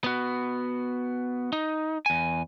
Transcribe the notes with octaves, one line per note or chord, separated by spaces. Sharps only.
B3 F#4
D#4
E2 G#5